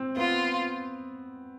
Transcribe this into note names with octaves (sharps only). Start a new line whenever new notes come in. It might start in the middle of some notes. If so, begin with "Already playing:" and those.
Already playing: C4
B3 F4